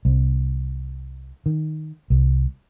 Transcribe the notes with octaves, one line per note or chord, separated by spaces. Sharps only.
C2
D#3
C2